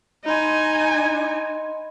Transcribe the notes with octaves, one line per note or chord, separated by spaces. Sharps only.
D#4 D#5 G#5 B5 C6